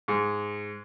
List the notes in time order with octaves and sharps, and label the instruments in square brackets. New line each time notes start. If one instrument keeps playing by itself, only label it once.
[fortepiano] G#2